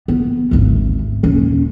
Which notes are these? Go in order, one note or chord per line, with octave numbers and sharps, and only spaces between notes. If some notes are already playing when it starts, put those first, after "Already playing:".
B3
G#1 D2
D#1 C#4